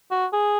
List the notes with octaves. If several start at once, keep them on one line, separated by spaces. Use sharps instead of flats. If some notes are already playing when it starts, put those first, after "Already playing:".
F#4
G#4